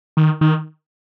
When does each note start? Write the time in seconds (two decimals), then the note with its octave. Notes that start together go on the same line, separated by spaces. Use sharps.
0.17 D#3
0.41 D#3